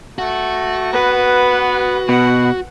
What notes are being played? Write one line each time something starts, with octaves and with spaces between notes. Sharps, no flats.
A3 F#4
B3 B4
B2 F#5